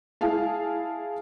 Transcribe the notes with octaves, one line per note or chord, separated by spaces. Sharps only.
E4 G#4 F5 A5